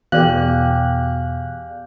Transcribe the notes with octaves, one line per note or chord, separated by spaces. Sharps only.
E2 B2 G4 G#4 D5 F5 F#6